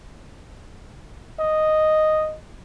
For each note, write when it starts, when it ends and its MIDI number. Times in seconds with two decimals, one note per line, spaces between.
1.40 2.36 75